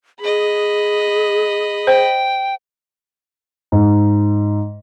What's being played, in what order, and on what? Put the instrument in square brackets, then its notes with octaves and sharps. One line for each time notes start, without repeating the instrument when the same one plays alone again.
[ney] G#4 [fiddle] D#5 B5
[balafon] C5 [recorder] G5
[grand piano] G#2